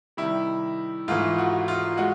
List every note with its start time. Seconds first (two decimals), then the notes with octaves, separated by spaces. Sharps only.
0.17 C3 D#3 G3 E4
1.08 G#2 E3 A3 F4
1.38 F#4
1.68 F4
1.98 G#3 F#4